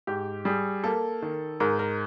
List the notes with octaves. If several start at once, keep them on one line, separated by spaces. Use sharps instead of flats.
G#2 G4
G3 G#4
A#3 A4
D#3
G#2 A#4
A#4